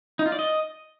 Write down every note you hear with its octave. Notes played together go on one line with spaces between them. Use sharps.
D#4
F4
D5
D#5